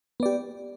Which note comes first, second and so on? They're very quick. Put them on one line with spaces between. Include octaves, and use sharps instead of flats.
B3 D5 G4